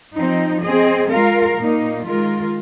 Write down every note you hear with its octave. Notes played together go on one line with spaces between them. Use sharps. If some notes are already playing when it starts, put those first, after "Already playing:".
F3 C4 D#4
C4 G#4 D#5
G#3 F4 A#4 F5
A#2 A#3 D#4
D#3 G#3 F4 A#4